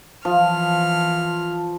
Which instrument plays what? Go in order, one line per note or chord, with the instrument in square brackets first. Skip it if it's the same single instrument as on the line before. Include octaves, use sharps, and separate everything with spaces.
[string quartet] E3 F6 [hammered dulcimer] F3